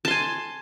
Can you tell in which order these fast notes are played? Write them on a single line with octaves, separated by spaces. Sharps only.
A5 C6 G#5